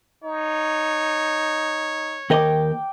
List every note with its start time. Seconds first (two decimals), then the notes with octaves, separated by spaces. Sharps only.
0.24 D#4 C#5
2.30 D#2 A#4 D#5 G5 D6